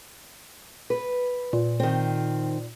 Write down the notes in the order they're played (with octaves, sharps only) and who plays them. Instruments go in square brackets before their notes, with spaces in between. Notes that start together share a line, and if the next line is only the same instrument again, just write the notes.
[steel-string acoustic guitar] B4
[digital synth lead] A#2
[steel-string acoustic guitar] D#3 C4